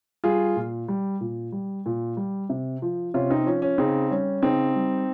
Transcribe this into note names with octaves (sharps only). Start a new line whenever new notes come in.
G3 F4 G#4
A#2
G3
A#2
G3
A#2
G3
C3
F3
C3 C#4 F4
C4 D#4
F3 C#4
C#4
C#3 C4 D#4
G3 C#4
C#3 C4 D#4
G3